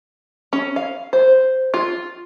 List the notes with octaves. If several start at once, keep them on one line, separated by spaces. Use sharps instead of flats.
C#4
F5
C5
F4